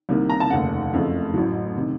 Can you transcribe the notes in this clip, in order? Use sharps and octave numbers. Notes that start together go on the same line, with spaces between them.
C2 C3 D#3 A#3
A#5
A5
F1 D#2 C#3 F#5
F#1 F2 C#3 A3
A1 A2 F#3
C3 D#3